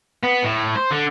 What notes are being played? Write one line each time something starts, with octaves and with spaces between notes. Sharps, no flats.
B3
A2
C5
D3